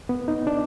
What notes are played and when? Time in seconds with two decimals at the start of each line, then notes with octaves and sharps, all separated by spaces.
0.09 B3
0.28 D#4
0.47 D4